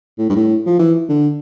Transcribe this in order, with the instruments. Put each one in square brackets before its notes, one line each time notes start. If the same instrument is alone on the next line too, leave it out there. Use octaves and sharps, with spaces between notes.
[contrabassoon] A2
G2
A2
F3
E3
D3